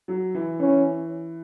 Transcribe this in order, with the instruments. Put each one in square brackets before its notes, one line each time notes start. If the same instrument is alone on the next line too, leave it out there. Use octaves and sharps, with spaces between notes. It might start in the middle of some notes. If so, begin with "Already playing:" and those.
[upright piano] F#3
E3
[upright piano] E3 [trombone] C#4